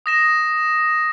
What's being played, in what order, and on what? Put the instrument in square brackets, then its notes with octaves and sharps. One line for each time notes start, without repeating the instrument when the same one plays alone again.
[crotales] D#6 A#6 E7